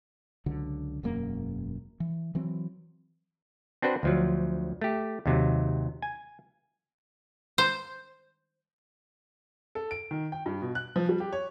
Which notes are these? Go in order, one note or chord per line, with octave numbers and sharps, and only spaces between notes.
C#2 D3 F#3
E1 F#2 A#3
E3
E3 F#3 C4
C4 D4 F#4 B4 C5
D2 F3 F#3
A3 G4
D#2 C3 F#3
G#5
C5
A4
D7
D#3
G5
G2
B2
F#6
F3
G3
G4
C#5